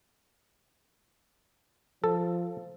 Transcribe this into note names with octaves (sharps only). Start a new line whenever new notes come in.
F3 A4